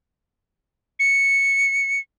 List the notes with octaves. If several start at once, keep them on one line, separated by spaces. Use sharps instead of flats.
C#7